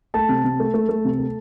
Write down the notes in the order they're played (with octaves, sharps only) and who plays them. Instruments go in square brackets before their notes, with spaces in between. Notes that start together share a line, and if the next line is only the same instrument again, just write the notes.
[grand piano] A3 A5
C3
C3
A3
A3
A3
C3
A3